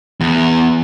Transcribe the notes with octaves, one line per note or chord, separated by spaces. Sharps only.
E2